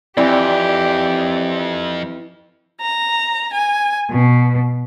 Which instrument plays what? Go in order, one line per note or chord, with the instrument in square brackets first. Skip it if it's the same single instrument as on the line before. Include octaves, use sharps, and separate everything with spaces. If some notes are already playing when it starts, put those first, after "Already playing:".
[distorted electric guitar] F2 [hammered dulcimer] E3 C4 [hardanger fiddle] G4 [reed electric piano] D5
[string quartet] A#5
G#5
B2